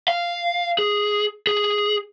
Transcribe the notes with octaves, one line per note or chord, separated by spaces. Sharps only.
F5
G#4
G#4